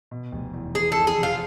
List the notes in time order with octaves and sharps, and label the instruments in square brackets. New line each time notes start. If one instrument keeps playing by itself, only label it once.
[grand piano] B2
F1
E2
[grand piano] E3 [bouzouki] G#4
[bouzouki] A4
[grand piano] F2
[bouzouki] G#4
[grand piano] C3
[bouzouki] F4